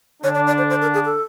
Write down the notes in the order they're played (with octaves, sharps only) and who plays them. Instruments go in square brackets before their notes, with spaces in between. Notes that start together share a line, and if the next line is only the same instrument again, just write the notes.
[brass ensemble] D3 D4 [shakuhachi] C#5
[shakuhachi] D5
D5
C5
C5
A#4
G#4
A4